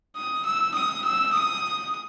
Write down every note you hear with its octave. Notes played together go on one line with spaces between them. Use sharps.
D#6
E6
D#6
E6
D#6